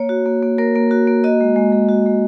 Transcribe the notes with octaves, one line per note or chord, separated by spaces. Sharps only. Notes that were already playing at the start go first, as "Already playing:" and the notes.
Already playing: A#3 C#5
F#4
A#3
A#3
A#3 A#4
A#3
F#4
A#3
F#4 D#5
G#3
G#3
G#3
F#4
G#3